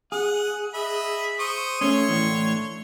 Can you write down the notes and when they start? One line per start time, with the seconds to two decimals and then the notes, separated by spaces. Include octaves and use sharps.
0.12 G#4 F#5
0.74 D#5 E5 B5
1.39 C5 C#6 D#6
1.81 A3 C#4 C#5 C6 C#6
2.08 A2 D3 E3